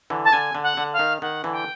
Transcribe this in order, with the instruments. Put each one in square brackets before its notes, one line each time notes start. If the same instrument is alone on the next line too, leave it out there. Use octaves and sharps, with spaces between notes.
[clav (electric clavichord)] D3 E3
[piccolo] A5
[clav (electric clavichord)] D3 [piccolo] G#5
[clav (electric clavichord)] D3
[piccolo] F#5
[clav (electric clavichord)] D3
[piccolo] F5
[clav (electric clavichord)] D#3
[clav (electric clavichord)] D#3 [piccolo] F#5
[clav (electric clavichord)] D3 E3
[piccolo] G5